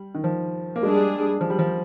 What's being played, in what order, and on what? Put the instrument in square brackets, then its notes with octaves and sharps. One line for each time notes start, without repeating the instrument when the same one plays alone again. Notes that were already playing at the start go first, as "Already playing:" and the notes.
Already playing: [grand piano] G3
D#3
F3
A#3
[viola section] G3 D4 G#4 [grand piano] G#3
[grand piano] F3
G3
F3